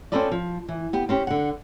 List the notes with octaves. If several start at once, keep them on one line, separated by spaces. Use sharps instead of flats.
C4 C#4 F4 A4 B4 D5
F3
E3
B3 G4
C4 C#4 G4
D3 F#5